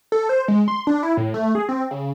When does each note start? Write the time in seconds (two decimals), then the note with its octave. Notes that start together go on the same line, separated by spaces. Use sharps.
0.12 A4
0.29 C5
0.48 G#3
0.68 C6
0.87 D4
1.03 E4
1.17 A2
1.34 A3
1.55 G#4
1.69 C4
1.91 C#3